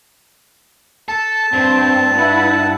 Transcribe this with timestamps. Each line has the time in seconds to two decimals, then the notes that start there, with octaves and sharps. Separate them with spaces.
1.08 A4 A5
1.53 G2 C4
2.13 E4 B4 F#5